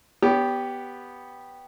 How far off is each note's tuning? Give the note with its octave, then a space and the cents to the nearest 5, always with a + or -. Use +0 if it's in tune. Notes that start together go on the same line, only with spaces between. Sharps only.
B3 +0 G4 +0 C#5 +40